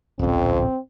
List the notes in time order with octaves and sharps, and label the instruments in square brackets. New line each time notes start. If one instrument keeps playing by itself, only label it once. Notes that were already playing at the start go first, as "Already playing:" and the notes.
[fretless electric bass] D1 A#1 C#4 [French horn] F2 [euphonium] C4